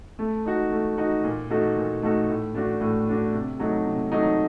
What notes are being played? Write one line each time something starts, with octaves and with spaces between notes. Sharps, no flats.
A3
D#4 F#4
A3
D#4 F#4
A#2
A3 D#4 F#4 A4
A#2
A3 D#4 F#4 A4
A2
A3 D4 F#4
A2
A3 D4 F#4
C3
F#3 A3 D#4
C3
F#3 A3 D#4